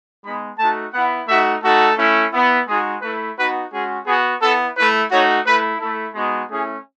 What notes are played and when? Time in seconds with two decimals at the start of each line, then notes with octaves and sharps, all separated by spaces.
0.24 G#3 B3 D#4 B5
0.58 A3 D#4 F#4 A5
0.92 B3 E4 F#5
1.28 A3 D#4 F#4 E5
1.62 A3 D#4 F#4 A4
1.97 A3 C#4 E4
2.32 B3 E4
2.67 G#3 D#4 F#4 G#4
3.01 A3 E4 B4
3.37 B3 D#4 F#4 B4
3.71 G#3 C#4 F#4 G#4
4.05 B3 F#4 G#4
4.41 B3 E4 A4
4.76 A3 E4 B4
5.10 A3 D#4 F#4 C#5
5.45 A3 E4 B4
5.80 A3 E4 A4
6.14 G#3 B3 D#4 F#4
6.49 A3 C#4 E4 G#4